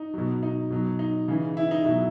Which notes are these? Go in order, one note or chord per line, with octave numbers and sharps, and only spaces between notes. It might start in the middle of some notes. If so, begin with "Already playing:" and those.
Already playing: D#4
B2 F#3
D#4
B2 F#3
D#4
C#3 E3
E4
D#4
B2 F#3 E4